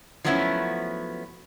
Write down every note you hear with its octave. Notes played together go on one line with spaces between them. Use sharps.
F3 F#3 A3 B3 C#4 E4